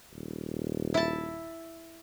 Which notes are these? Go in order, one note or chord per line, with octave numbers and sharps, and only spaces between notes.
D#1
E4 A5